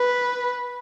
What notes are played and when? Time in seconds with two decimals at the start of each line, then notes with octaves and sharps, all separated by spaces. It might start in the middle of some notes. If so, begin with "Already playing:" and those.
Already playing: B4